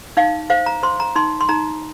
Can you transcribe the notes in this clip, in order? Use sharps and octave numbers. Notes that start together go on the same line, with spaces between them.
D#4 F5
C5 F5
A#5
C5 C6
A#5
D#4 C6
C6
D#4 A#5